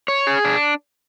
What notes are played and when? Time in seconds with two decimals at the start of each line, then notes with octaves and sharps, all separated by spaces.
0.08 C#5
0.27 G#4
0.45 D4